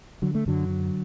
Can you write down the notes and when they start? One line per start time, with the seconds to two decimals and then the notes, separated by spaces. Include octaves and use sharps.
0.22 D3 F#3
0.35 A3
0.46 F#2 D3 F#3
0.69 D3